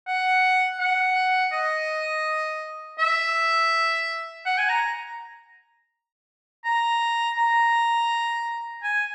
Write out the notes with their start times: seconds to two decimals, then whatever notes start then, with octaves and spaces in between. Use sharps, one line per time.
0.07 F#5
0.79 F#5
1.52 D#5
2.99 E5
4.46 F#5
4.58 G#5
4.69 A#5
6.65 A#5
7.37 A#5
8.83 G#5